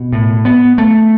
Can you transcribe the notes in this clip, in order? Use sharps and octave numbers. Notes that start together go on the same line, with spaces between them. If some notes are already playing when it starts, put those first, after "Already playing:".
Already playing: B2
A2
B3
A3